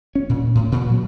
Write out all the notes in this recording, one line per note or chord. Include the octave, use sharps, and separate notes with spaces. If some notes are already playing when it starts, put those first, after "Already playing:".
C#4
A#2
A2
A#2
F#3